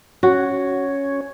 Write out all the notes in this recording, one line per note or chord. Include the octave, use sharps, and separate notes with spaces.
C#4 F#4 C#5